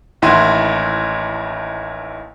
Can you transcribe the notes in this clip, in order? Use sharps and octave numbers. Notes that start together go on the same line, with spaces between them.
A1 D#2 E4 F#5 C6 D#7